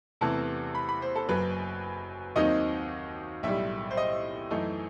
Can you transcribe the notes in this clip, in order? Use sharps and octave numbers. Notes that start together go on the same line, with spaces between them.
E2 C3 E3 A3 A5
B5
B5
C5
A4
F#1 F#2 F#3 B4
D#2 D#3 F#3 C4 D#4 D#5
B1 A2 G3 E5
C5
D#5
F#2 E3 A3 D#4